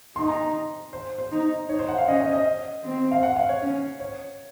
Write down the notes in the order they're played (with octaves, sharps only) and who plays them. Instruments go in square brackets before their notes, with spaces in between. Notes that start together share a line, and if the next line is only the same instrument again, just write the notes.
[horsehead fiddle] D#4 [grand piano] C6
[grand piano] A#5
C5
C5
[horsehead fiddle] D#4
[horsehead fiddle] D#4 [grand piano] C#5
[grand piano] C5
F#5
F5
[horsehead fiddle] C#4 [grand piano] D#5
[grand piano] D#5
D#5
[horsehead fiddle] C4
[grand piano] F5
F#5
F5
C#5
[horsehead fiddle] C#4
[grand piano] C#5